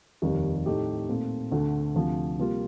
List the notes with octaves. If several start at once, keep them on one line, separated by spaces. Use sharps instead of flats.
F1 D#2 D#3 G3
A2 A3 D#4 G4
A#2 A3 C4
D2 D3 A3
D2 C3 F3
C3 G3 A#3 F4